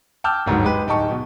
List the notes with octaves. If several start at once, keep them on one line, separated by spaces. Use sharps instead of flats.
G5 A5 D6 E6 F6 G6
G1 D#2 G#2 F#3
G#3 G4 B4
D1 D#4 G5 A5 C#6
B2